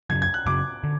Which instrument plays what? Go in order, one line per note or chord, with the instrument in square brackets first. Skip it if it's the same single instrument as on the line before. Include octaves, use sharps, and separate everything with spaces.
[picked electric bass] F#2 C#3 F#3 [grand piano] G#6
[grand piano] G#6
F#6
[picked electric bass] F#2 C#3 F#3 [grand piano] D6
[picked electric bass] D3